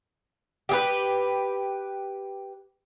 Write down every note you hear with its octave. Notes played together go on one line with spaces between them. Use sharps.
G4 G#4 B4